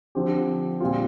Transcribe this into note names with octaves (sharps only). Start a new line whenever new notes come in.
D3 F3 C4 G4
A#2 G3 C4 F4